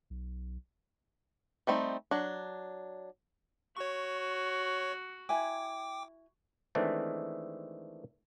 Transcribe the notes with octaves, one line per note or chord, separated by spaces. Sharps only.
B1
G3 A3 C4 D#4
F#3 D4
F#4 C#5 C#6
E4 G5 G#5 D6
D#3 E3 G#3 A3 C4 D4